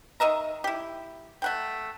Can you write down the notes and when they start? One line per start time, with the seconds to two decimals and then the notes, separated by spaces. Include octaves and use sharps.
0.20 D#3 D#5 E5 A#5
0.64 E4 G4
1.42 A3 F#5 G5